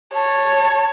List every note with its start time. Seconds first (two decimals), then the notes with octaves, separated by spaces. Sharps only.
0.14 C#5 A5